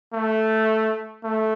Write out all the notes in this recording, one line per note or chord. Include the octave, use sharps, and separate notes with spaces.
A3
A3